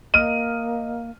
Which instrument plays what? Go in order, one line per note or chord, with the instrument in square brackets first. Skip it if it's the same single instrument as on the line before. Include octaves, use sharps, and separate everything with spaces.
[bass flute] A#3 [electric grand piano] D#5 F6 [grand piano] D#7